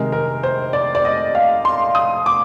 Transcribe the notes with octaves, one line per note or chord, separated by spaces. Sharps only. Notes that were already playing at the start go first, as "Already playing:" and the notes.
Already playing: C3 D#3 G#3 A#4
A#4
C5
D5
D5
D#5
F5
C6
D#6
D6